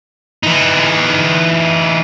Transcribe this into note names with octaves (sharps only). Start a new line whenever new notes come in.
E3 D#4